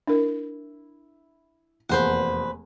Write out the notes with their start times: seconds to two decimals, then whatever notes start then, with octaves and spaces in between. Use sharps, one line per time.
0.07 D4 E4 A#4
1.89 F1 E2 A#3 B4 C5 F#5